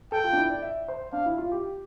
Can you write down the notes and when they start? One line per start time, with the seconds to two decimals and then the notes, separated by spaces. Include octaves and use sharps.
0.12 A4 G5
0.24 F4
0.33 D4
0.37 E4
0.50 D5
0.62 E5
0.88 C5
1.13 D4 F5
1.26 E4
1.38 F4
1.52 G4